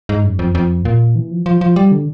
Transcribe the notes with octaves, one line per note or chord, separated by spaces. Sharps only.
G#2
F#2
F2
F2
A#2
E3
F3
F3
F3
G3
D3